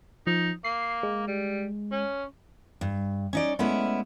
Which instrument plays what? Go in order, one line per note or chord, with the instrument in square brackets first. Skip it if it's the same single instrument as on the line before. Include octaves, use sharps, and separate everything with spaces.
[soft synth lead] F3 [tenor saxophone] D#4
[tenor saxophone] A#3 [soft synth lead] C7
[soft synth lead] G#3
[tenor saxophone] G3
C#4
[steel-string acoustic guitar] G2
C#4 D#4 D5
G#3 A3 B3 C#4 E4